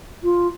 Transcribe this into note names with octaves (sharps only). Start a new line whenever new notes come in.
F4